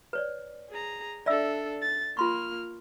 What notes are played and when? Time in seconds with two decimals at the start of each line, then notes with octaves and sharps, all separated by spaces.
0.13 B4 C#5 D5
0.70 G#4 A#5
1.26 D4 A4 D5 E5 E6
1.82 A6
2.17 A#3 F4 C6 C#6 F6